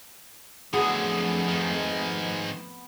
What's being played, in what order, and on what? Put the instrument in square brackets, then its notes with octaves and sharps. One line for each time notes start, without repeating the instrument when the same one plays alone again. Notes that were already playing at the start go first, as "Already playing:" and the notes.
[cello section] F2 A3 [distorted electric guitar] D3 F#3 [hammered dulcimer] B3 [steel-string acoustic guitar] G#4
[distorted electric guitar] G#2 D#3